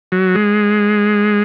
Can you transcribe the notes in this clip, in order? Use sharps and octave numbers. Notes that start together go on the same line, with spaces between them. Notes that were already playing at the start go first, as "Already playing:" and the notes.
F#3
G#3